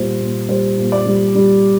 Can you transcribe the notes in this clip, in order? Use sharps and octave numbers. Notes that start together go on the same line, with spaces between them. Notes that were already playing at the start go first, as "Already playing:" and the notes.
Already playing: A#2 G3 C5
A#2
G3 C5
A#2
D5
G3
G3